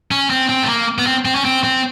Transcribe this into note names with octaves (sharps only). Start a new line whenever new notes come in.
C#4
C4
C4
A3
A#3
B3
C4
C4
C#4
C4
C4